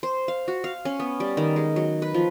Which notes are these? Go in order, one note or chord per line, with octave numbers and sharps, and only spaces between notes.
C5
F5
F#4
F5
C#4
B3
G3
D#3
G#3
F#3
B4
F3